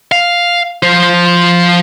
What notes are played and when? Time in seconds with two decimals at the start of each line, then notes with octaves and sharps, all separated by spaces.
0.12 F5
0.83 F3 C5